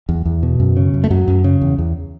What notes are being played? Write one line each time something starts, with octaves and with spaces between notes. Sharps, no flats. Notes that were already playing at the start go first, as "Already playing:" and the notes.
E2
E2
B2
F#2
C#3
F#2
A3
F#2 F#3
F#2
C#3
E2
E2